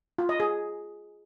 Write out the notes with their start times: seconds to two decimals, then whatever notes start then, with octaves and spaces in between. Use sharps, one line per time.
0.18 F4
0.29 D#5
0.40 G#4